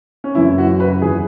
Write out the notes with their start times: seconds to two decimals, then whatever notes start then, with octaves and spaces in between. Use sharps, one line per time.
0.24 C#4
0.35 F#2 C#3 E3 E4
0.58 F#4
0.80 B4
1.02 E2 E3 G#4